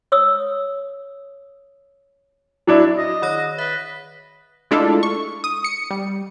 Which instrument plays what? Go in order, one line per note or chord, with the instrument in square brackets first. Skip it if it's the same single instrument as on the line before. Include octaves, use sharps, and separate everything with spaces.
[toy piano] C#5 D#6 E6
[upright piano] F#3 D4 E4
[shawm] D#5
[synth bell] D#3 C#5 A#6
[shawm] B4 [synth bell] E5
[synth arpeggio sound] G#3 A3 D4 E4 F4 A4
C#6
D#6
C#7
G3